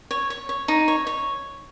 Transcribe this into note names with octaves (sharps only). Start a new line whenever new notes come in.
C#5
C#5
C#5
D#4
C#5
C#5